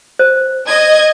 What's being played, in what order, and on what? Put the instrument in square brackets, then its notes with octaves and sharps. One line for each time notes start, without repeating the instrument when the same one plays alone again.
[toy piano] C5
[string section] D#5 [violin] G#6